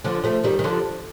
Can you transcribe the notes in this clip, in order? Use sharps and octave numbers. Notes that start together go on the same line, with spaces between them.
D3 F3
F3 A3
D#3 G3
D#3
D3 F3